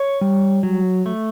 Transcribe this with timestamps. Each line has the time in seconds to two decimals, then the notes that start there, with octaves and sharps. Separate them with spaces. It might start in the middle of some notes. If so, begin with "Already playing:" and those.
Already playing: C#5
0.21 G3
0.63 F#3
1.06 A3